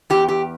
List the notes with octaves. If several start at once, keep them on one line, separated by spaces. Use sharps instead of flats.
E2 G4
G4